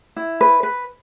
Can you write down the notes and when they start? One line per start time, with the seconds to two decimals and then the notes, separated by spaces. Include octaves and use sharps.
0.16 E4
0.41 B4
0.63 B4